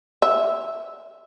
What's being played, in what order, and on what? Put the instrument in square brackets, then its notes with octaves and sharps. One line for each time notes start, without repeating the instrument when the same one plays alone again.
[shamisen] E5